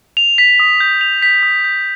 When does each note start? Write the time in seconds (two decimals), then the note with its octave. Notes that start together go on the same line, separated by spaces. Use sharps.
0.17 F7
0.38 B6
0.59 D#6
0.80 G6
1.01 F7
1.22 B6
1.43 D#6
1.64 G6